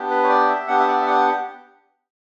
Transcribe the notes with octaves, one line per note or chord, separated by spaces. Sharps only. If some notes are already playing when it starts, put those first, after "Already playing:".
Already playing: B3 D4 G4
B4
C#5
D5
E5
B3 D4 G4 F#5
E5
D5
E5
F#5